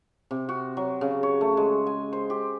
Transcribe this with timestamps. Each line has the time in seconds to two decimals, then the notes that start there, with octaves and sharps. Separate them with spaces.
0.31 C3
0.49 F#4
0.77 F#3
1.01 C#3
1.23 C#5
1.41 A3
1.57 G#3
1.86 G#5
2.13 C5
2.30 G4